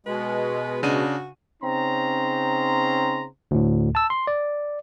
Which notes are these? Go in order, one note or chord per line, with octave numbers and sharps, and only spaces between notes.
B2 G#3 B4
C#3 D4 F#4 D#7
C#3 C4 C#4 D#4 A#5 C6
D2 A2
A5 E6
C6
D5